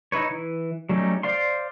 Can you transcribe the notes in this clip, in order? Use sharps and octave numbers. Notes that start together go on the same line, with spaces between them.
D#4 E4 B4 C#5
E3
F#3 G3 A3 C#4 D#4
C5 D5 F5 C6